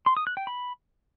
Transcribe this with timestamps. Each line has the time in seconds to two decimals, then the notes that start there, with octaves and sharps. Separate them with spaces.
0.06 C6
0.17 D#6
0.27 F#6
0.37 G5
0.47 B5